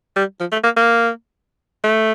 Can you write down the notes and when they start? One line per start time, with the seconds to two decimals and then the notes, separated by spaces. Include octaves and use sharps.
0.16 G3
0.40 F3
0.52 A3
0.64 A#3
0.77 A#3
1.84 A3